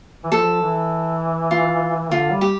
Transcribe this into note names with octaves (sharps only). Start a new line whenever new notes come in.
E3
F3 A4
E3
F4
D3 F4
G3
G4